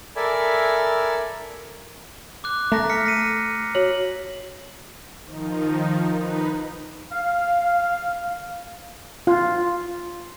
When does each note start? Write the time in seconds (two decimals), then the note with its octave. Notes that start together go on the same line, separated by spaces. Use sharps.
0.16 A4 A#4 D5 E5 G#5 B5
2.44 D6 F#6
2.72 A3 A#5 A#6
2.90 F6 B6 C#7
3.06 A#6 C7 D#7
3.75 F#4 C#5 F#7
5.24 D#3 F3 D#4
6.17 D#4 B4
7.12 F5
9.27 F4